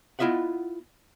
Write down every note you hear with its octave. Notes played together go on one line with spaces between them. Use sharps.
B3 E4 F4 D#5 E5 F#5